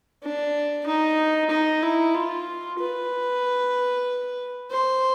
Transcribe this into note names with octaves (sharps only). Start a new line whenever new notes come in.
D4
D#4
D#4
E4
F4
B4
C5